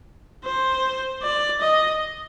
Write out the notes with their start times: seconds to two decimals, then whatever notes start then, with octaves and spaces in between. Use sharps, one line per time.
0.44 C5
1.23 D5
1.61 D#5